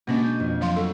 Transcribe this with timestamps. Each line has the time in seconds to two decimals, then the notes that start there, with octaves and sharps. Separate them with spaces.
0.07 B2 G#3 A#3 C#4 D4
0.23 G6 D#7
0.40 F2
0.61 F3 F#3 F5 C6
0.76 F#3 C4 A4